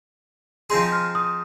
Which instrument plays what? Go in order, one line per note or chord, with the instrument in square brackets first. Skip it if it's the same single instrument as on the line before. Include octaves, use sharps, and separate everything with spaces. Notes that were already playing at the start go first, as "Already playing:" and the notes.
[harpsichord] F3 C4 D#4 G#4 [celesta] C6
[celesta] F6
D#6